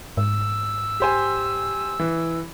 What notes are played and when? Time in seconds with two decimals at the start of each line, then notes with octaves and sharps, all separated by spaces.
0.17 G#2 E6
1.00 G4 C5 G#5
1.99 E3